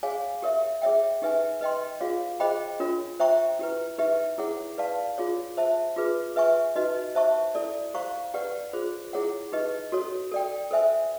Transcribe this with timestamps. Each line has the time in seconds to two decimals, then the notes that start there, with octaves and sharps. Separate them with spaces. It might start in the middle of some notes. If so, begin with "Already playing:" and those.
0.03 G#4 C#5 F5 G#5
0.42 G4 A#4 C#5 E5
0.82 G#4 C#5 E5 G5
1.22 D#4 G4 B4 E5 G#5
1.61 B4 D#5 G5 C6
2.01 F4 G#4 C#5 F5
2.40 G#4 C5 D#5 G5 B5
2.80 D4 F4 A#4 C#5
3.20 C5 E5 G5 A#5 C#6
3.59 E4 G4 B4
3.98 D#4 G4 B4 E5
4.38 E4 G#4 C#5 F#5
4.78 B4 D5 F5 A5
5.18 F4 G#4 C#5
5.57 C5 E5 A5
5.96 F4 G#4 B4
6.36 B4 E5 G#5 C#6
6.76 D#4 F#4 B4 D#5
7.15 C5 E5 A5 C#6
7.55 E4 A4 D5
7.94 G4 C5 F5 A#5 C#6
8.34 G4 B4 D5 F#5
8.73 F4 G#4 C5
9.13 E4 G#4 C#5 F#5
9.52 D#4 G4 B4 D#5
9.92 F#4 A4 C#5
10.32 A4 D5 G5
10.71 A4 C5 E5 G#5